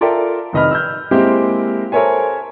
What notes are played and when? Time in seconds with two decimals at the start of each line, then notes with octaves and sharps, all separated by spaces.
0.01 F4 A4 A#4 D5 E5 G5
0.53 F1 D#3 D#5 B5 F6
0.71 E6 F6 G6
1.11 G#3 A#3 C4 E4 G4 A#4
1.92 A4 A#4 C5 C#5 E5 G#5